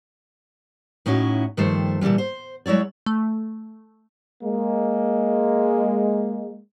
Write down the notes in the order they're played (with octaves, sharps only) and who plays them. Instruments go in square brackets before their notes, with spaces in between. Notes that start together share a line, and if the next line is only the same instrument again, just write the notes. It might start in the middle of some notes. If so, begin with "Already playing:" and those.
[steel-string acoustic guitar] A2 B3 C#4 D#4 E4 F#4
G2 D#3 F3 A3 C5
A#2 D3 E3 G3 G#3
C5
F#3 G#3 E4 C#5 D5
[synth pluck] A3
[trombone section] G#3 A#3